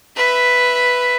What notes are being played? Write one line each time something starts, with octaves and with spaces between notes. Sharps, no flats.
B4 E5